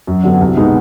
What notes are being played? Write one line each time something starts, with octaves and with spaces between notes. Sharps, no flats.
F#2
D3 F#3 B3
C2
B2 G#3 B3 D#4